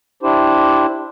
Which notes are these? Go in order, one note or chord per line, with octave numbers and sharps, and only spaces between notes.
D4 E4 G4 C5